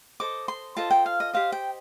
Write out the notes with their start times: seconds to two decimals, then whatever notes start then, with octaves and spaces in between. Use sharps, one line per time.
0.20 A4 C5 D#5 D6
0.48 C6
0.77 F4 A4 C5 D#5 A5
0.91 G5
1.06 F5
1.20 D#5
1.33 G4 C5 D#5 F5
1.52 G5